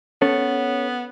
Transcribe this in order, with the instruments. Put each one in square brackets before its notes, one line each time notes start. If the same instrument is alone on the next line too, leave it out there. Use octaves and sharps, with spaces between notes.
[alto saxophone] B3 [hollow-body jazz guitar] C#4 A4 C#5